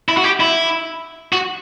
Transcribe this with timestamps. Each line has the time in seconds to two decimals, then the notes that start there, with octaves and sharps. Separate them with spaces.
0.09 E4
0.17 F#4
0.24 G4
0.40 E4
1.33 F#4